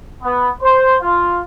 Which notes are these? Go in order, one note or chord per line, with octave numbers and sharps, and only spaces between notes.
B3
C5
F4